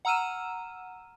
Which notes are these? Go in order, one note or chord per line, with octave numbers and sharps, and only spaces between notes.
F#5 A#5 E6 F6 D#7 E7